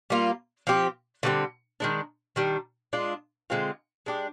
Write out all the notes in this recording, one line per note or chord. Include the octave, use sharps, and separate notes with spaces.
G3 A#3 F4
F3 C4 G4
D3 G3 C4
D#3 G#3 D4
D#3 G3 D4
G#3 D4 F4
D3 G#3 C4 F4
G#3 D4 G4